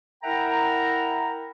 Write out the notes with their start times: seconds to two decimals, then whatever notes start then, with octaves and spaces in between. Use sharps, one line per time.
0.24 E4 A#4 E5 F#5 G5 A#5